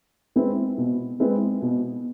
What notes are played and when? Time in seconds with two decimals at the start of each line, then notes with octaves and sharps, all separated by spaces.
0.36 G#3 C4 E4 B4
0.78 B2
1.20 G#3 C4 E4 B4
1.62 B2